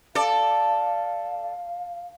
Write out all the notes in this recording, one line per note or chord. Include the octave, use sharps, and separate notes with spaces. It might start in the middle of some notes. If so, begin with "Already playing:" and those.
A4 D5 F5